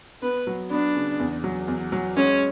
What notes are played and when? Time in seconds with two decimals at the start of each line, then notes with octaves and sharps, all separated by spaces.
0.22 B3 B4
0.47 F#3
0.71 B3 D4
0.95 C#3
1.20 E2
1.44 F#3
1.68 E2
1.92 F#3
2.16 G#3 C#4